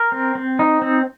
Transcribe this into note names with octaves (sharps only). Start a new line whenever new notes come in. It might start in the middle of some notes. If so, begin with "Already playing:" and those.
Already playing: A#4
C4
C4
D#4
C4